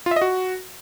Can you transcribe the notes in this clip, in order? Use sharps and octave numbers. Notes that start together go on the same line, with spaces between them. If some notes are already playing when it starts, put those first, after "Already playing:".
F4
E5
D#5
F#4